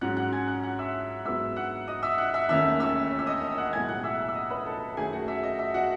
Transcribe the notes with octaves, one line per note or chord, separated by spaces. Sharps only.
G#2 F#3 C#4 F#5 F#6
F#5 F#6
G#5 G#6
F#5 F#6
F#5 F#6
E5 E6
G#2 F#3 B3 E5 E6
F#5 F#6
D#5 D#6
E5 E6
F#5 F#6
E5 E6
E1 D#2 D#3 A3 C#4 E5 E6
E5 E6
E6
D#5 D#6
F#5 F#6
B1 A2 G#3 G#5 G#6
F#5 F#6
E5 E6
E6
D#5 D#6
B4 B5
A4 A5
F#2 D#3 A3 G#4 G#5
F#4 F#5
E5
D#5
E5
F#4 F#5